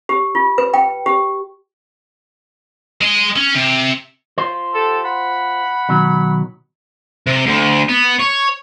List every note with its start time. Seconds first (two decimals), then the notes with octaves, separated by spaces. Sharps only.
0.09 G4
0.35 F4
0.58 B4
0.74 G5
1.06 G4
3.01 G#3 D#5
3.36 C#4
3.55 C3
4.38 F4 C5
4.74 G4 A4
5.05 F#5 B5
5.89 B2 D#3 F#3
7.27 C3
7.46 D2
7.89 B3
8.19 C#5